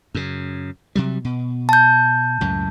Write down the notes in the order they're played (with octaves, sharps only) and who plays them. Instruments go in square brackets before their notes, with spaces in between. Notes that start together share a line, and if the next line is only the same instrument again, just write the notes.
[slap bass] F#2 C#3
C3 F#3 G3
B2
[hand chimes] A5 G6
[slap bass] C#2 F#2 A2